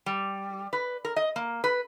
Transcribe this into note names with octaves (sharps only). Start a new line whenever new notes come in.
G3
B4
A#4
D#5
A#3
B4